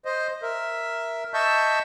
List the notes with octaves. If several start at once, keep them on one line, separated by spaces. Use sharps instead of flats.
C5 D#5
A#4 E5
D#5 E5 A5 C#6 E6 G6